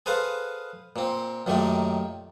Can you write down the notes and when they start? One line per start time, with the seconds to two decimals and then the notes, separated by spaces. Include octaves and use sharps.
0.06 G#4 A4 B4 C5 F5 F#5
0.96 A#2 C4
1.47 F#2 A#2 D#3 A3 G4